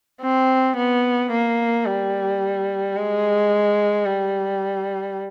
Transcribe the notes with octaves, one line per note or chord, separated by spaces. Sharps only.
C4
B3
A#3
G3
G#3
G3